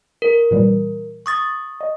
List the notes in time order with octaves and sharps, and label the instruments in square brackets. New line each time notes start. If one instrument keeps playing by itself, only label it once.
[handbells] A#4
[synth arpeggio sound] A#2 E3 G3
[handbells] C#6 D#6 A6
[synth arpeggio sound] D#5